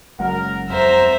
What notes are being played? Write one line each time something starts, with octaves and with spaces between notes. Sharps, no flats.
F#1 F#3 G#3 A#4 F#5
F2 C5 E5 A#5